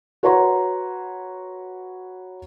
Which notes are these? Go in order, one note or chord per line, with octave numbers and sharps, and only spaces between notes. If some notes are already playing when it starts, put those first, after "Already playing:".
F#4 B4 C#5 F#5 A#5 C6